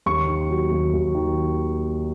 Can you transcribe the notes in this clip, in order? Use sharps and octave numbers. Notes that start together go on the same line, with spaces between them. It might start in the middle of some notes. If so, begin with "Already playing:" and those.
D#2 C#6
D#3
F#3
D#2
D#2
D#3